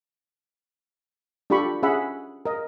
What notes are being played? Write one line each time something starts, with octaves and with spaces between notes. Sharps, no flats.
D4 F4 G4 A4 B5 C#6
C#4 G#4 E5 F#5 B5
A#4 D#5